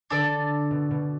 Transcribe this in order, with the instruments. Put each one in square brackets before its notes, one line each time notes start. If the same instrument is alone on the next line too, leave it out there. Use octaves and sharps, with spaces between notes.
[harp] D3 [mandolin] D4 A4 D5
[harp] B2
B2